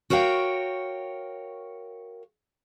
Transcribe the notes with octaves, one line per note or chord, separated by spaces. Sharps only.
F#4 A#4 C#5 F5 G5